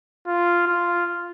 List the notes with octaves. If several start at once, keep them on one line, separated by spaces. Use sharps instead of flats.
F4
F4